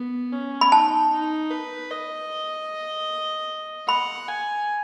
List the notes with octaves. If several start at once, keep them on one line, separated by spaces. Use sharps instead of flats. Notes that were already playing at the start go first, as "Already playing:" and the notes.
Already playing: B3
C#4
B5
D#4 A5
D#4
B4
D#5
F#5 B5
G#5